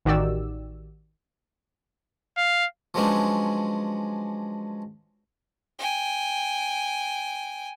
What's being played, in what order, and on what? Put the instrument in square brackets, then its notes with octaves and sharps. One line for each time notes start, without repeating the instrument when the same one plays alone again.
[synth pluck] A1 D#3 F#4 G4 D5 E6
[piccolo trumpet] F5
[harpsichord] F3 F#3 G#3 B3 C#4 D4
[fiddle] G5 G#5